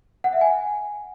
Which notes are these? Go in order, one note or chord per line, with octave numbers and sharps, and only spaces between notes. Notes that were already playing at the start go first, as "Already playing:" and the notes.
F#5
E5
G#5